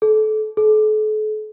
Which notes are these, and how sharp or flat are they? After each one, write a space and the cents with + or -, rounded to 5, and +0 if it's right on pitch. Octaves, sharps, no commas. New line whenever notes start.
A4 -30
A4 -40